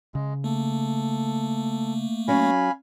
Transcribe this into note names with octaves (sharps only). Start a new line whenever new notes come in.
C#3 G#3
A3 A#3 A4
F#3 C#4 F5 G#5 B5